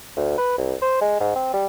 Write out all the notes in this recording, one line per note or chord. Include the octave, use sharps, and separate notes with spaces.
D2
B4
C2
C5
G#3
G#2
C4
G3